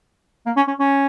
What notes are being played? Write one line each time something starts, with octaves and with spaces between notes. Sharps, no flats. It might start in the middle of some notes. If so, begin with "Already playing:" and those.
A#3
C#4
C#4
C#4